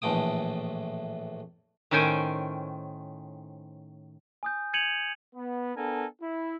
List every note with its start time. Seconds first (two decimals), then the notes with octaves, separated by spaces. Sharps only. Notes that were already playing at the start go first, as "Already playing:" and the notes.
0.02 A#1 A2 E3 A3 G5 D#6
1.91 A2 D#3 C#4 C5 G5 G#5
4.43 G#5 D#6 G6
4.73 G6 G#6 C#7 D#7 F7 F#7
5.35 B3
5.75 B3 D4 A4 A#4 G#5
6.21 E4